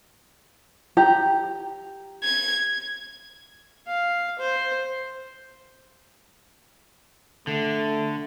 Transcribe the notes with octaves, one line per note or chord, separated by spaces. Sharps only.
G4 A#5
G#6
F5
C5
D3 A3